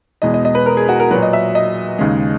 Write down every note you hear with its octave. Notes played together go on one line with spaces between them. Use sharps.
E2 B2 G#3 D#5
D#5
D#5
B4
A#4
G#4
F#4
A#4
A#2 F#3 B4
D#5
E5
D#5
D#2 C#3 G#3